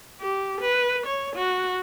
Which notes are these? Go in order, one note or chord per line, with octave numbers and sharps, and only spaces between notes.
G4
B4
C#5
F#4